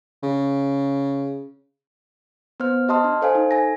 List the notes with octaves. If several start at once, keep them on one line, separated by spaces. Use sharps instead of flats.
C#3
B3 C5 F6
G4 D#5 A5 C6 D#6 F6
D4
A4 C5 F5 G#5
D#4
A4 G#5 A#6